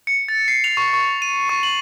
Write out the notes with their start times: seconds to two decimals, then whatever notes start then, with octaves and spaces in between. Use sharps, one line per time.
0.07 C#7
0.28 A6
0.48 C7
0.64 F7
0.77 C#6
0.93 C#6
1.22 D#7
1.49 C#6
1.63 F#7